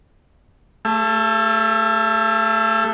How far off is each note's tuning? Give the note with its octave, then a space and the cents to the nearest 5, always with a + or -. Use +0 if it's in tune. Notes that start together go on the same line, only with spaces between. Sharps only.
A3 +0 G#4 -45 E5 +40